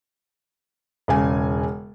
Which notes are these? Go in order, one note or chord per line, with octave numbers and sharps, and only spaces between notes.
E1 C#3 G#5